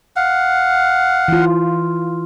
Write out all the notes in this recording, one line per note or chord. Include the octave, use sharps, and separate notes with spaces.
F5 F#5
E3 F4